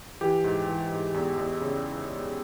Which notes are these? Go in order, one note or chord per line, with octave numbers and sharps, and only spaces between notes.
E3 G4
G#2
E3
G#2
E2
E2
C#3